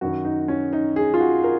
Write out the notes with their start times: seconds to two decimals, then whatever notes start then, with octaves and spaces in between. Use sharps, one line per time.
0.01 F#2 D#3 F#4
0.25 D#4
0.48 C#4
0.73 D#4
0.96 G#4
1.14 F4
1.20 F#4
1.44 A#4